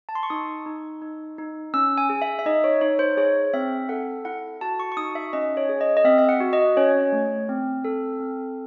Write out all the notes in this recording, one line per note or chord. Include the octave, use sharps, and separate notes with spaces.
A5
C6
C#6
D#4 D#6
D#4
D#4
D#4
C#4 E6
G#5
G#4
E5
E5
D#4 D#5
C#5
D#4 C#5
C5
G#4 C#5
C4 E5
A4 F#5
E4 F#5
F#4 A5
C#6
C#6
D#4 D#6
E5
C#4 D#5
C#5
G#4
D#5
D#5
C4 E5
E5
F#5
F#4
D#5
C#4 C#5
A3
C4
A4
C4